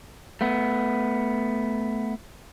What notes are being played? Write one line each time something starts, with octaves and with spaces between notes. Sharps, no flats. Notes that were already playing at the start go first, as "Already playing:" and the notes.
A3 B3